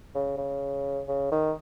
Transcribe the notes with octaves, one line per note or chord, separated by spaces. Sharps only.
C#3
C#3
C#3
D#3